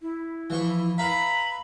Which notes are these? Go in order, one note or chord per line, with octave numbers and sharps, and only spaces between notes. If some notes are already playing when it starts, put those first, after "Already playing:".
E4
E3 F3 C#6
B4 E5 F5 A#5 B5